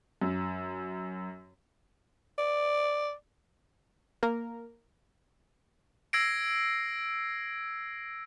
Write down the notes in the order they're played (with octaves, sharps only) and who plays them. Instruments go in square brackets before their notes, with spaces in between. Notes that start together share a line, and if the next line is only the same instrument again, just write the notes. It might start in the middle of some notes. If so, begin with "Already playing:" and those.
[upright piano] F#2
[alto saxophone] D5
[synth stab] A#3 A#4
[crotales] E6 G#6 A#6 C7 D7